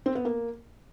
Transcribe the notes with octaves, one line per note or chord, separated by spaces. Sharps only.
C4
B3
A#3